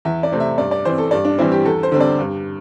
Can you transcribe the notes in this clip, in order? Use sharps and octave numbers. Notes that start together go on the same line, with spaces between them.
E2 E5
D5
C3 A3 C4
E5
G2 D5
D5
E3 C4 C5
A4
G2 D5
D4
E3 G3 C4 E4
G4
E2 A4
C5
D3 G3 C4
D5
G2